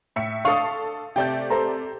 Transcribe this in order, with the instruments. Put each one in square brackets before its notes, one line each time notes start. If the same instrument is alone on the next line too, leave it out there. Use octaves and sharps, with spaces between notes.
[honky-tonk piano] A2 E5 C#7
[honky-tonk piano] D4 A4 [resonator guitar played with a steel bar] F5 [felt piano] C#6 D#6
[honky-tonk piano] C3 D5 G6 [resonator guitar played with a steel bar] A3 G5
[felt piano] A4 C5 A#5